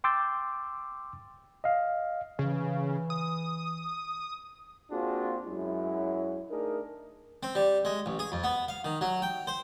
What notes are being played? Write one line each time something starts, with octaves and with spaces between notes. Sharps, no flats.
G5 C6 D6 E6 G6 A6
D#5 F5
C#3 E3
D#6
A#3 C4 D4 F4 F#4 G#4
F#2 F#3 G#3 E4
A3 D4 D#4 G#4 A#4
C4
G3
G#3
A1
G#4
F2
B3
F5
D#3
F#3
G5
C5